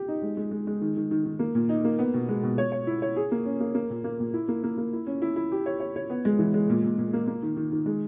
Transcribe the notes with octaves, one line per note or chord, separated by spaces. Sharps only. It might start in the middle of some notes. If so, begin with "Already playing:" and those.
Already playing: G4
D#4
G#3
G#3
G#3
G#3
D#3
D#3
D#3
D#3
A#3
A#2
D#4
A#3
B3
B2
G#3
B2
C#5
C#5
E4
C#5
G#4
A#3
C#4
A#3
A#3
A#2
A#3
A#2
E4
A#3
A#3
A#3
E4
C#4
E4
E4
G4
C#5
C#5
C#5
B3
G#3
E3
G#3
A#2
A#2
A#2
A#3
A#3
D#3
D#3
D#3
G#3